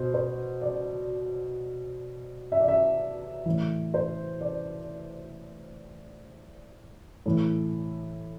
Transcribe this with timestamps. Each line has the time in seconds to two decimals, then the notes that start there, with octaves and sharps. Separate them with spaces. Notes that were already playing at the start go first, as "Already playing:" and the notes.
Already playing: B2 C5
0.14 C5
0.62 D5
2.52 E5
2.60 D5
2.68 E5
3.46 A2 E3
3.94 C5
4.41 D5
7.26 A2 E3